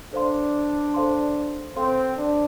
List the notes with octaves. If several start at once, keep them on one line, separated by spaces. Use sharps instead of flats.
D4 A4 C5 F5 C6
A4 C5 F5 C6
C4 A4 C5 F5 C6
D4